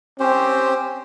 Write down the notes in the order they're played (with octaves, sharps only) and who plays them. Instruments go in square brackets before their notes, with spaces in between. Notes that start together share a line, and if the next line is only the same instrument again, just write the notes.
[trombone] C4 [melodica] C#4 G4 C5